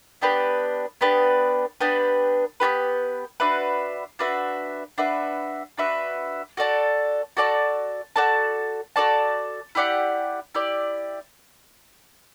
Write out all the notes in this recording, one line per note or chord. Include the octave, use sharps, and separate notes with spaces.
B3 D4 G4 B4
B3 D4 G4 B4
B3 D4 G4 B4
B3 D4 G4 B4
D4 F#4 B4 E5
D4 F#4 B4 E5
D4 F#4 B4 E5
D4 F#4 B4 E5
F#4 A4 D5 A5
F#4 A4 D5 A5
F#4 A4 D5 A5
F#4 A4 D5 A5
E4 G4 D5 F#5
E4 G4 D5